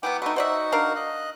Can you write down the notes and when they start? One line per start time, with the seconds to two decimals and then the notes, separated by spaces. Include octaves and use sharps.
0.03 E3 F#3 B3 F#5 G5 D6
0.22 A3 D#4 F#4 B4
0.36 D#4 F#4 C5 D5 E5 F#5
0.72 D4 A#4 F5
0.96 D#5 F#6